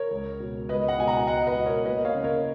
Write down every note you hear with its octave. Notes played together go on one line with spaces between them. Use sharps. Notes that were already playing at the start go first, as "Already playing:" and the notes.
Already playing: A#4 C#5
C#2
B2
C#2 B4 D#5
D#5 F#5
B2 G#5
F#5 A#5
C#2 D#5 F#5
B4 D#5
B2
A#4 C#5
A#3 B4 D#5
C#5 F5
C#3
A#4 C#5